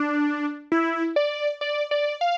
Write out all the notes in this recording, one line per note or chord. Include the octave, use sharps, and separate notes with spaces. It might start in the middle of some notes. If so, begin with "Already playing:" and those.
Already playing: D4
E4
D5
D5
D5
F5